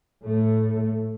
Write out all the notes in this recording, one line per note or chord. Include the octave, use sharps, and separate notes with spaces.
A2 A3